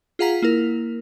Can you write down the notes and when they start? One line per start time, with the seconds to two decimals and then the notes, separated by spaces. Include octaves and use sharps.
0.19 F4 G#4 F5 F#5 A#5 B6
0.42 A#3 E4 A#4